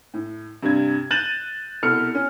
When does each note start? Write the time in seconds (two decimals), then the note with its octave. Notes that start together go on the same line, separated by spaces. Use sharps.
0.14 A2
0.63 G2 C3 G#6
1.11 F#6 G6 A6 D#7 E7 F#7
1.83 C2 B2 A4 F6 C#7
2.15 C#4